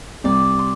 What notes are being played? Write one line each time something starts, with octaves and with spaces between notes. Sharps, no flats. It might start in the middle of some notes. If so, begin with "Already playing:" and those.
C2 C3 D5
C6